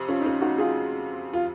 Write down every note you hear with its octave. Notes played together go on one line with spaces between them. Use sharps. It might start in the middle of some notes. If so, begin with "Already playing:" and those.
Already playing: F2 C3
C#4 F4
D#4
C#4 F4
D#4 F#4
F4 G#4
F4